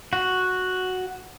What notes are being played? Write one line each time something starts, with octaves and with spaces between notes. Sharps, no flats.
F#4